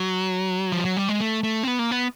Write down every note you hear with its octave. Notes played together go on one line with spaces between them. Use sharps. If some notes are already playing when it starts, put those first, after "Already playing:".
Already playing: F#3
F3
F#3
G3
G#3
A3
A3
C4
B3
A#3
B3